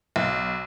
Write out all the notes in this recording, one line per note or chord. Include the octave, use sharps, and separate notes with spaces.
B1